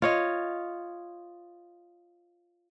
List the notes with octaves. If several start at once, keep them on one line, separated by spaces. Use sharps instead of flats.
F4 C#5 D#5